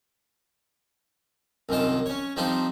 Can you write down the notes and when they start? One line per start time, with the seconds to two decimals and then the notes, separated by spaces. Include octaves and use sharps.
1.69 C2 F#2 D#3 F4 D#5 A5
2.06 C#4 C#5
2.36 F3 G3 C4 D#4 F4 A4